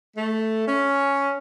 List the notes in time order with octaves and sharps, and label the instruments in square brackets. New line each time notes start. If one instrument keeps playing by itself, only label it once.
[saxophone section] A3
C#4